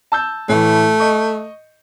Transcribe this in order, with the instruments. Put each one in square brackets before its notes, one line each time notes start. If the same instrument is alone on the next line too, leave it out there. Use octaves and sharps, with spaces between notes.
[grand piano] A5 E6 G6
[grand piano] A2 E3 [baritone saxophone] A3
[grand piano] D#5 C#6